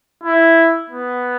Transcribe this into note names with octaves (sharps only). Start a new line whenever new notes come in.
E4
B3